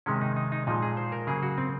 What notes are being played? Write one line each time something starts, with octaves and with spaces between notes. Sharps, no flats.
C3 D#3 G#3 C#4
D#4
D#4
D#4
A#2 F3 G#3 D#4
G#4
C5
A#4
C#3 F#3 A#3 G#4
F#4
C4